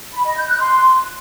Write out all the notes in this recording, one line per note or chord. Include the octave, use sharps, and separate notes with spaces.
B5
D#5
G6
F#6
C6